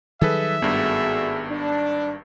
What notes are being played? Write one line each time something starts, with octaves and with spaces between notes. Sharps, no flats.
D#3 F#3 G3 G#4 A4 B4 E5
G#1 G2 A3 B3 F#4 G#4
D4